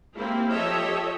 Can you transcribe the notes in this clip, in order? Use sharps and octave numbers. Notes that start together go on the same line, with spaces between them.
A#3 C4 E4 G4
F3 G4 A4 C#5 D#5 E5